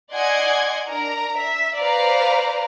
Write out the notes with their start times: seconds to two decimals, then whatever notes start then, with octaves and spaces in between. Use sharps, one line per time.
0.12 D5 D#5 F#5 G#5 C6 G#6
0.87 D4 A#4 A#5
1.38 E5
1.78 B4 C5 D5 F5 A#5